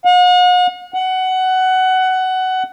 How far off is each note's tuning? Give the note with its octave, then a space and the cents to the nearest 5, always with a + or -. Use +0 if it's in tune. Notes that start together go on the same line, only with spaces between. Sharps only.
F#5 -45
F#5 +15